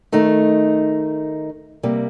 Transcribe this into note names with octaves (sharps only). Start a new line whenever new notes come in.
D#3 A3 D#4
C3 G3 A#3